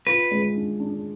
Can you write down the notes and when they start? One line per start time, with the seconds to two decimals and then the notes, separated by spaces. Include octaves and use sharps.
0.07 F4 B4
0.31 G#3
0.56 D4
0.80 D4